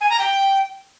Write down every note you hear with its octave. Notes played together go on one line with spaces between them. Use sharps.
G#5
A#5
G5